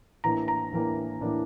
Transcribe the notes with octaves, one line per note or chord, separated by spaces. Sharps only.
A2 E3 A#3 D4 A#5
A#5
A2 E3 A#3 D4
A2 E3 A#3 D4